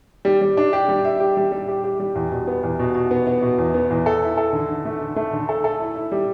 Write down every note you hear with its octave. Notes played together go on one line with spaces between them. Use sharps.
G3
G3
D4
G4
G3
E5
G4
G3
G3
G4
G4
G3
E2
B2
B3
E2
B2
B2
B3
B3
B2
E2
B3
E2
A4
E4
A4
D3
D3
A3
D3
A3
D3
A4
A4
E4
E4
G3